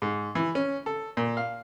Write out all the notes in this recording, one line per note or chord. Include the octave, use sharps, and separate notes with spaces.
G#2
E3
C#4
A4
A#2
F5